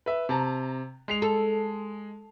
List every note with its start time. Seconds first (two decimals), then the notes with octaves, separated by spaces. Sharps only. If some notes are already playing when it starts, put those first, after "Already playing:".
0.06 B4 E5
0.29 C3 A5 A#5
1.08 G#3 C7 F7
1.22 A4